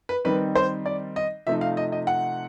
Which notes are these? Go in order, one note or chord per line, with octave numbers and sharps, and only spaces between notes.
B4
D#3 G3 C4 D#4 B4
C5
D5
D#5
C3 F3 A3 C4 D#4 E5
F5
D#5
D#5
F#5